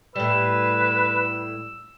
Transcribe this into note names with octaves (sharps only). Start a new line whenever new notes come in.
A2 G3 B4 E6